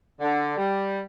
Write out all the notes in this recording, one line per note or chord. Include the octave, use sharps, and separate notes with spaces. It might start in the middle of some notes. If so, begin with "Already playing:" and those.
D3
G3